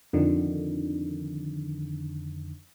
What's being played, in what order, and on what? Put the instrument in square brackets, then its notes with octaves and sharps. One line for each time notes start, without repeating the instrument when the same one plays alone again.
[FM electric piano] F2 D3 D#3